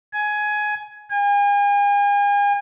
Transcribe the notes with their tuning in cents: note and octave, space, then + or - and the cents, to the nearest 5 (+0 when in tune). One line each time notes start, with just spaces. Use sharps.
G#5 +15
G#5 -40